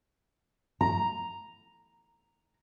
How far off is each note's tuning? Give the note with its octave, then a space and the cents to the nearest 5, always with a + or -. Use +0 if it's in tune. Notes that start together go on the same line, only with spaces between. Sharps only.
A#5 +0